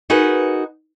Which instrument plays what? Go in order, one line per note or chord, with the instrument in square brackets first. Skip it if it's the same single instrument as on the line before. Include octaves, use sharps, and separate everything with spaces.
[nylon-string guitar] D#4 F#4 G#4 A#4 B4